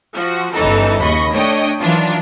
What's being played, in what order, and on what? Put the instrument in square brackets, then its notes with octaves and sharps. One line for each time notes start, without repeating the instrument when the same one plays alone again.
[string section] F3 F#4
G1 C#3 E3 D#4 A4
D#2 C#3 D#5 B5 C#6
A3 D4 C#5 D#5 G5
D#3 E3 F#3 D4 F4